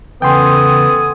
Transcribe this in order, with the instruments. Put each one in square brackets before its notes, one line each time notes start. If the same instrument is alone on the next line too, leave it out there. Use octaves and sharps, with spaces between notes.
[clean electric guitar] E2 C#3 [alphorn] B3 [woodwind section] A4 G#5 D#6 [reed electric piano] G5 C6